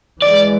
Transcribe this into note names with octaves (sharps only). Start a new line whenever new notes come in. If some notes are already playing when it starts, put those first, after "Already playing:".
E3 G#3 D5